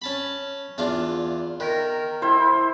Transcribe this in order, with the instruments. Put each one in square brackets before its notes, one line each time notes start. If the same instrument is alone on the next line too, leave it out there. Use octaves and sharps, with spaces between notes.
[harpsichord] C#4 A5 B5
E2 D4 F4
[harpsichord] D#3 [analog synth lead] A#4
[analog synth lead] E4 [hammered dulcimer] C5